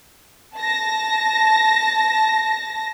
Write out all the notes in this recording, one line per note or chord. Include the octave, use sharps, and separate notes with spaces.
A5 A#6